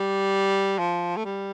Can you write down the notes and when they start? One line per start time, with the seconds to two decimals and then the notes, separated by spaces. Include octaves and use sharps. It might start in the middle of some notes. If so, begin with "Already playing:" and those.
Already playing: G3
0.79 F3
1.17 A3
1.26 G3